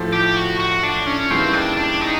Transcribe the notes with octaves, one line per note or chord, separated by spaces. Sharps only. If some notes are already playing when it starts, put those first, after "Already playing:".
Already playing: A2 F3 A3
G4
F#4
F#4
D4
C#4
D#2 C#3 E3 G3 C4
D4
D4
D#4